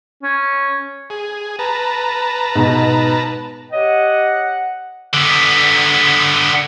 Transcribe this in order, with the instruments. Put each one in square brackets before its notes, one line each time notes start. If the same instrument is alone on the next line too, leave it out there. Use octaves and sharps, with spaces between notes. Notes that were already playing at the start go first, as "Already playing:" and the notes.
[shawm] C#4
[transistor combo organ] G#4
B4 A5 A#5
[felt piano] G#2 B2
[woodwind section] G4 C#5 D#5 [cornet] F#5
[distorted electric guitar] D3 B3